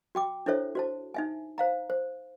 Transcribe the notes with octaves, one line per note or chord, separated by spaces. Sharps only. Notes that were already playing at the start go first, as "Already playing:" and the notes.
F#4 G5 D6
D4 E4 A4 C5 C#5 E5
F#4 C5 A5
D#4 E5 G#5
C5 F5 A#5
C5